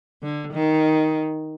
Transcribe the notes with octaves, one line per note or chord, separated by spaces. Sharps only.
D3
D#3